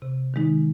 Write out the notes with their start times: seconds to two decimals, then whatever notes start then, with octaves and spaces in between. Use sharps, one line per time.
0.02 C3
0.34 D#3 G#3 D#4